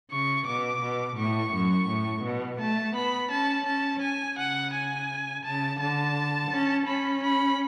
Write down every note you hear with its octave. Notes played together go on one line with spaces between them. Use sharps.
C#3 C#6
B2 D6
B2
A2 C#6
F#2
A2
B2
A3 A5
B3 B5
C#4 A5
C#4 A5
G#5
C#3 F#5
G#5
C#3 A5
D3 A5
C#4
C#4 B5
B5